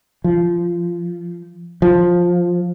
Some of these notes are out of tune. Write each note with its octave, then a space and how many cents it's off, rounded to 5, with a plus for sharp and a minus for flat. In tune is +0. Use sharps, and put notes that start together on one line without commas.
F3 -15
F3 +10